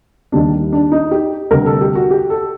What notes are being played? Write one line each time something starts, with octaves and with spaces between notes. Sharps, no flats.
D#2 D#3 G3 A#3 D4
D4
D#4
G4
D2 C3 G3 A#4
A4
G4
F#4
G4
A4